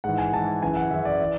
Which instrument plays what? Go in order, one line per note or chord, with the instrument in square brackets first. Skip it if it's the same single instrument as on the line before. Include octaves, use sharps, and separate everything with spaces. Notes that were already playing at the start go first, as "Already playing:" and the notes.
[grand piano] G#2 E3 F#5
G#5
G#2 E3 A5
F#2 C#3 E3 G#5
F#5
F#2 C#3 E3 E5
D5
E3